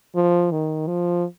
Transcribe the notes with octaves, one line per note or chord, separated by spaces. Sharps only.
F3
D#3
F3